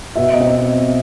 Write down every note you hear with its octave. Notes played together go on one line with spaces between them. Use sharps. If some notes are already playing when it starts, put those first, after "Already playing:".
B2 E5
D#5
C4